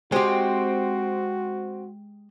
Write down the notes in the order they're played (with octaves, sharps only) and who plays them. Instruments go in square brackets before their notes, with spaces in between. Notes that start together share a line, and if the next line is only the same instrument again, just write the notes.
[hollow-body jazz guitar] G#3 G4 [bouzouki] C4 [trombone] F#4